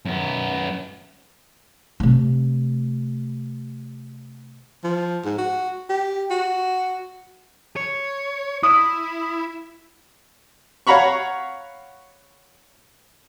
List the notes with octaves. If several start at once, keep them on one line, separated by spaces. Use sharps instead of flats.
F#2 B3
C3 A3
F3
G#2
F#4
G4
F#4
C#5
E4 D#6
C#5 F5 F#5 A#5 B5 C#6